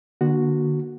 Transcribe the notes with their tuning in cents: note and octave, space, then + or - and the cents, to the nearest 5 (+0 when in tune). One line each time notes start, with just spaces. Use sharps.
D3 +30 A#3 +45 F#4 +0